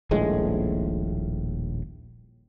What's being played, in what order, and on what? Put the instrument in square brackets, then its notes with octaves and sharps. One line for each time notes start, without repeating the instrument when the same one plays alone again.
[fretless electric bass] D#1 A#1 A2 G#3